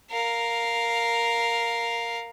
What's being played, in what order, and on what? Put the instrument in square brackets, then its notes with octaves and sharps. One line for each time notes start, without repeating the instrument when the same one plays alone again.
[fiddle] A#4 F5